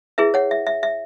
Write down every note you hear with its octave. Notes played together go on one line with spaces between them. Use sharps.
E4 G#4 B4 E5
C#5 F#5
E5
E5
E5